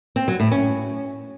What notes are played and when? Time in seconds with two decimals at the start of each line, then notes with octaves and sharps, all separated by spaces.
0.16 C4
0.28 F#3
0.40 A2
0.52 C#4